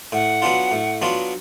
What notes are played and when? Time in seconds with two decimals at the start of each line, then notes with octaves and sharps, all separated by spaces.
0.12 A2 F#5
0.42 F#3 B3 D4 F4
0.72 A2
1.02 F#3 B3 D4 F4